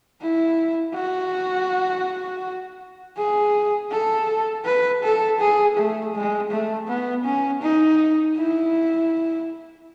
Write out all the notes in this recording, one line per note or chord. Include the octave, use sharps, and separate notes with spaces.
E4
F#4
G#4
A4
B4
A4
G#4
A3
G#3
A3
B3
C#4
D#4
E4